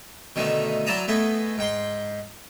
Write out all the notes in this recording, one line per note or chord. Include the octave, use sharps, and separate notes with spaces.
B2 D3 D#3 A3
F#3 E4 D5 A5 A#5 D#6
A3 B3 G#4 D#5
G#2 G5 C6